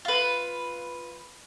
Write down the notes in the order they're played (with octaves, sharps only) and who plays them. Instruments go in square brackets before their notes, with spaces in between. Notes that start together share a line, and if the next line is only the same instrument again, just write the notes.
[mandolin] F4 B4